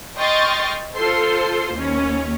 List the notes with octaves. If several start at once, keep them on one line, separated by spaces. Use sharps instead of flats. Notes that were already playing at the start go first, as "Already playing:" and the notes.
D#5 G5 C6 C#6 F6 A6
F4 A4 C5 C6
D#2 C#4